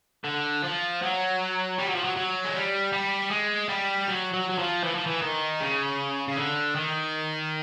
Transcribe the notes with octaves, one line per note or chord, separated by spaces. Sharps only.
D3
F3
F#3
G3
F#3
F3
F#3
F#3
G#3
G3
G3
G#3
G3
F#3
F#3
F#3
F3
E3
F3
E3
D#3
C#3
C#3
D3
D#3